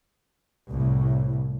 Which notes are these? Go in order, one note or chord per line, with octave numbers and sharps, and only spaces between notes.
C2 A2